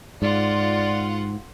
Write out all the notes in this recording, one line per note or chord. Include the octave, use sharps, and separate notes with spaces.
G#2 F4 D5 F#5